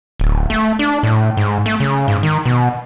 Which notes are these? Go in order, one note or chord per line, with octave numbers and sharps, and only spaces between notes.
D1
A3
D4
A2
G#2
A3
C#3
G#2
D#3
B2